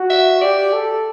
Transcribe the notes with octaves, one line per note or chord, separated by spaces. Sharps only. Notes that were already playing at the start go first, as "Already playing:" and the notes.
Already playing: F#4
E5
G4 D5
A4